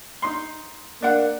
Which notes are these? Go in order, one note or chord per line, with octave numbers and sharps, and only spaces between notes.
D#4 C6
A#3 D4 F#5